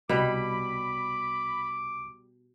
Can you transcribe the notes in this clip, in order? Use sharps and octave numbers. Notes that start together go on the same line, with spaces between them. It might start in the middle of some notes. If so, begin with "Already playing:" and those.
C2 B2 G3 B5 D6